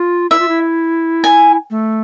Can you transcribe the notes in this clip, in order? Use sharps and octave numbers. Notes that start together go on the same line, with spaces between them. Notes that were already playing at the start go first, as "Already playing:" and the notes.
Already playing: F4
E4 E5
F4
E4
G#5
A3